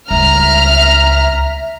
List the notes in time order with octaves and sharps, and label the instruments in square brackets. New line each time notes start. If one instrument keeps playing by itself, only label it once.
[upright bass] C#2 G3 [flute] E5 [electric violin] A#5 [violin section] F6